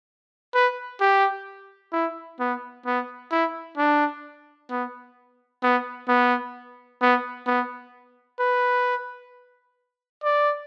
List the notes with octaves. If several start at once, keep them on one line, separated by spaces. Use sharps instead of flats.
B4
G4
E4
B3
B3
E4
D4
B3
B3
B3
B3
B3
B4
D5